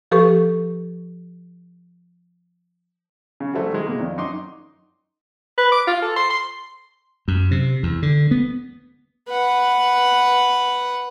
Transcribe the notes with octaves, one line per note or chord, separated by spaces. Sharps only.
F3 G4 A4 B4 C#6
C#3
F#3 G3 A3 C4 E4 F#4
D#3 G#3
B2 G#3 A#3
F2 D#3 D4
F#2 D#4 C6 D6
B4
D6
F4
A4
C6
C6
F#2
C3
E2
D3
B3
B4 F#5